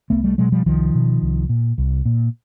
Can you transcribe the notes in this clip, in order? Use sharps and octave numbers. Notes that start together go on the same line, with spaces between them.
C2 A3 B3
G3 A3
B2 F#3 G#3
F3 G3
C2 D#3 F3
B2
C2
A#2
C2
A#2